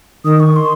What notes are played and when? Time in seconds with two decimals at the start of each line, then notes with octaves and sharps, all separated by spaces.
0.25 D#3 D#6
0.40 C#6
0.56 C6